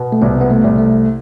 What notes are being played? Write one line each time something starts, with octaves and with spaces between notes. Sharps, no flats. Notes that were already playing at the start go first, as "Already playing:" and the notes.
Already playing: B2
A3
C2 B3
B3
A3
C2
A3